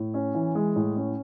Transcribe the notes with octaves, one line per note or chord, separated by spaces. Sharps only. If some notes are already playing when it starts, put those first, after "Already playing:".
Already playing: A2
C#4
E3
G#3
A2
C#4